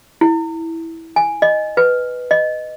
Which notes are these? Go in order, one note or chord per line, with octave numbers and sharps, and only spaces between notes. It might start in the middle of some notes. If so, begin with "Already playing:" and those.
E4
G#5
D#5
B4
D#5